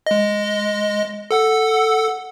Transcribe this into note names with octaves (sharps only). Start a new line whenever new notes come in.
G#3 D#5
A4 F#5 E6